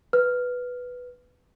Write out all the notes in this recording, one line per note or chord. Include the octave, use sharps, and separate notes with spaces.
B4 F6